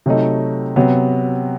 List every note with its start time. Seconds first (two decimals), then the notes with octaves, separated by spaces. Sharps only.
0.06 C3 F#3 A3 D#4
0.76 C3 F#3 B3